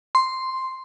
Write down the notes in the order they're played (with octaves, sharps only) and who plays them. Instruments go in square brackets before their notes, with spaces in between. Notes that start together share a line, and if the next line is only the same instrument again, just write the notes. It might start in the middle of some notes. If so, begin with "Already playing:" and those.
[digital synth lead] C6